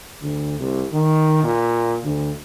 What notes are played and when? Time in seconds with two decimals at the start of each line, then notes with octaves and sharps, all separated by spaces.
0.22 D2
0.59 C2
0.93 D#3
1.44 A#2
2.03 D2